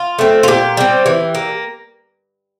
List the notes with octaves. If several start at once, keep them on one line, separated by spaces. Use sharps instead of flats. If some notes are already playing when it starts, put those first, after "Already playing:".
Already playing: F4
A3 C4
F4
A#2 G4
G3 C4
E3
A#3